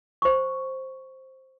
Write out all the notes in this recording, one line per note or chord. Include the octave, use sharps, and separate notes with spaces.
C5 C#6